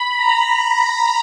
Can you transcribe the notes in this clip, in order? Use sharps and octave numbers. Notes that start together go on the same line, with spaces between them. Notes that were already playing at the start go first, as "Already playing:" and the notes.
Already playing: B5
A#5